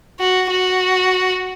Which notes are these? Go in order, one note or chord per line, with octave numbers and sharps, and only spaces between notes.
F#4
F#4